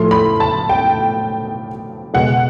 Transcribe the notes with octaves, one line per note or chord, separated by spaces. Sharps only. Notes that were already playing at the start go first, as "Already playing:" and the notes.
Already playing: A2 F3 A3 C6
B5
A5
G5
B2 G#3 F#5